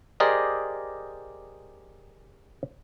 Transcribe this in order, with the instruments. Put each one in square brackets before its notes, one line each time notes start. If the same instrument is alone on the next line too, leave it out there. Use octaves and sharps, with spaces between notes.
[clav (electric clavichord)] G4 G#4 A#4 C5 D5 D#5